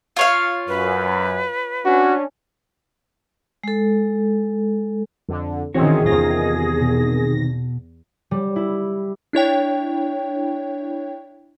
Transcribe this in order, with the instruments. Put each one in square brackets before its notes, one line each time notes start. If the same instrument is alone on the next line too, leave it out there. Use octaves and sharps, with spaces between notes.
[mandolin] F4 C#5 F5
[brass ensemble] F#2 [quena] B4
[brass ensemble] C#4 D4 [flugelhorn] F#4
[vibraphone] G#3 A4
[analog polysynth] F2 D3
[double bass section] D#3 C#4 [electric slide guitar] E3 F#4 [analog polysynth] C4 [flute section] G#4
[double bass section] E2 [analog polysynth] C3 D#3 A#6 [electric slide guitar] F4
[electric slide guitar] B2
[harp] G3
E4
[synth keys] D4 E4 C#5 G5